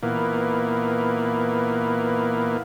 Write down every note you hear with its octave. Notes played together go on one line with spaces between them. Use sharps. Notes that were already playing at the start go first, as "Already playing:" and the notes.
A#2 E3 A#3 B3